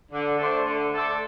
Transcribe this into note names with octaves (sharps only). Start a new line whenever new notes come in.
D3
A3 D4 A4 C5
D3
A3 D4 A4 C5